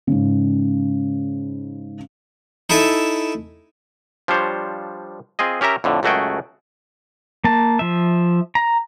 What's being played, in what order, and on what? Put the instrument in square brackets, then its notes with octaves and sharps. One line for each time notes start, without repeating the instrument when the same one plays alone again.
[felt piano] G#2 C#3
[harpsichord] D#4 E4 A4 E5 G#5
[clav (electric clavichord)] F3 G3 D4 C5 C#5
C4 F4 G#4 D#5
C#4 G4 A#4 E5 A#5
F2 A2 D3
C#2 F#2 A3 F#4 G#4 G5
[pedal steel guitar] A#3 A5
F3 E5
A#5